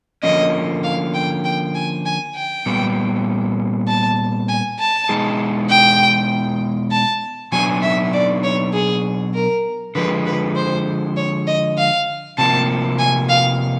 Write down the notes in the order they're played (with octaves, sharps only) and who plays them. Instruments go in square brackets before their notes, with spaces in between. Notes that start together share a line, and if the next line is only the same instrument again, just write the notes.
[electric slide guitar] D3 F3 A#3 C#4 [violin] D#5
[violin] F5
G5
G5
G#5
G#5
G5
[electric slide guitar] A#2 G3 B3
[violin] A5
G#5
A5
[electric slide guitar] B2 G#3 B3 D#4 G#4
[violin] G5
A5
[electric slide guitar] B2 F#3 B3 D4 [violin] G#5
[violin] E5
D5
C#5
G#4
A#4
[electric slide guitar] D3 F3 G#3 [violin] B4
[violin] B4
C5
C#5
D#5
F5
[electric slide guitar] C3 F3 A#3 [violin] A5
[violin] G#5
F5